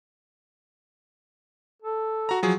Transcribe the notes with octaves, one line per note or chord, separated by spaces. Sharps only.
A4
F#4 A#5
F3 F#3 G#4